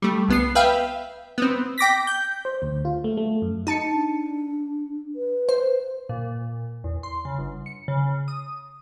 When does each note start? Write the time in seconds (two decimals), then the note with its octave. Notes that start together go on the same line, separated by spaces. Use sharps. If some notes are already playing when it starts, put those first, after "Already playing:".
0.02 G3 A3
0.28 C2 B3 C7
0.55 B4 E5 F5 G5
1.38 B3 C4
1.78 G5 D6 A#6 B6
2.07 G6
2.45 C5
2.62 D2
2.85 F4
3.04 A3
3.17 A3
3.42 F#2
3.67 D#4 A5 C#7
3.90 D4
5.16 B4
5.49 C5
6.09 A#2
6.84 E2
7.03 C6
7.25 C#3
7.38 G1
7.66 C#7
7.88 C#3
8.28 D#6